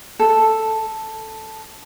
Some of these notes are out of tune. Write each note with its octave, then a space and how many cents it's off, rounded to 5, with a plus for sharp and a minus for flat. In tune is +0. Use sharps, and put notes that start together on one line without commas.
A4 +0